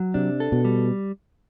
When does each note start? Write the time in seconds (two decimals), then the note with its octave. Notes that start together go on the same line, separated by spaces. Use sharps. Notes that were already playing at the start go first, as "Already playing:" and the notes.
Already playing: F#3
0.14 C3 D4
0.40 A4
0.52 B2
0.65 G3